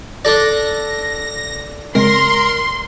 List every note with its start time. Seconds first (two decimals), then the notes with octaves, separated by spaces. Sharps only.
0.25 D4 A4 D5 A#6
1.95 C#3 G#3 C4 A#4 C6